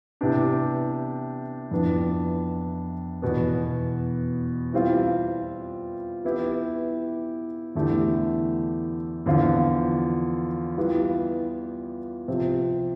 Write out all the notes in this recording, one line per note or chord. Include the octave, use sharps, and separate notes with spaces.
C3 E3 B3 D4 G4
F2 E3 B3 D4
E2 B2 B3
E3 G3 C4 F4
E3 B3 E4 G4
E2 D3 A3 E4 G4
E2 D3 F3 C4 F4
E3 G3 B3 F4
C3 F3 C4